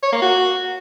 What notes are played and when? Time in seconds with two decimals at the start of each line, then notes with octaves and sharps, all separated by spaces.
0.03 C#5
0.12 A#3
0.22 F#4